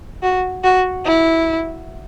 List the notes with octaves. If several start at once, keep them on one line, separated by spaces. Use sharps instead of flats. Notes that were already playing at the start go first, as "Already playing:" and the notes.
F#4
F#4
E4